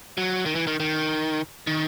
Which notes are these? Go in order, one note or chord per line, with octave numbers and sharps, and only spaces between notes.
F#3
D#3
E3
D#3
D#3
D#3